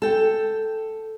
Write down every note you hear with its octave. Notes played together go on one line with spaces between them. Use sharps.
A4 G5